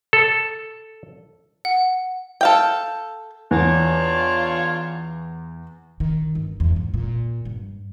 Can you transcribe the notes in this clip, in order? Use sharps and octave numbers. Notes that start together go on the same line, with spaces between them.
A4
F#5
A4 F5 G5
E2 D4 F4 C#5
D#3
G1
E2
G#2
A#2
G2